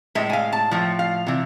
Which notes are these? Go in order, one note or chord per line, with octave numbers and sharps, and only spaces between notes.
A2 G#3 E5
G#5
F5
A5
A2 F3
F5
C3 E3